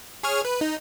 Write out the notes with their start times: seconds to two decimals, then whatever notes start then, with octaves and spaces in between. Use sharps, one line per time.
0.23 G#4 C#5 F6
0.45 B4
0.61 D#4